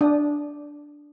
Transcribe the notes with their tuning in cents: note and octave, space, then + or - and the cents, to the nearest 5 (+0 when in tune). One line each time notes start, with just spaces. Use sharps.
D4 +0 D#6 -15